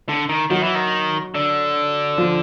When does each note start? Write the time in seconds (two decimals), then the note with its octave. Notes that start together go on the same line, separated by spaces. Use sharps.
0.09 D3
0.29 D#3
0.50 D#3 F#3 F#4
0.63 E3
0.75 D#3
1.35 D3
2.18 F3 F4